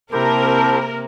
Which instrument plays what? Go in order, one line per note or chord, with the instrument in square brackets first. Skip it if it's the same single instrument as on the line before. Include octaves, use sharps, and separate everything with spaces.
[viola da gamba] C3 A#3 C4 [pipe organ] E4 G4 C5 [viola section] A#4 [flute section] A5